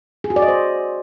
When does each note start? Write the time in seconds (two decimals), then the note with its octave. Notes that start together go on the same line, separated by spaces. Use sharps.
0.24 G#4
0.30 F#4
0.36 D5
0.42 D#5
0.48 C5